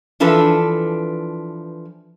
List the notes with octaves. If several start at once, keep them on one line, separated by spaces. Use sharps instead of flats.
E3 F3 D4 A4 B4